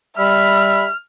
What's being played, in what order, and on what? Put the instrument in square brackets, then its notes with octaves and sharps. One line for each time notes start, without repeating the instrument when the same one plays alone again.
[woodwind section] G3 E5 B5 [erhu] F6